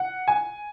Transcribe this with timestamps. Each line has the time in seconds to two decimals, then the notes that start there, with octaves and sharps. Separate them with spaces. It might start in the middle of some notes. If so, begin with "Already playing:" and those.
Already playing: F#5
0.28 G#5